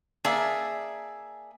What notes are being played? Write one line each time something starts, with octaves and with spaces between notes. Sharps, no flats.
A#3 G#4 D5 E5 A5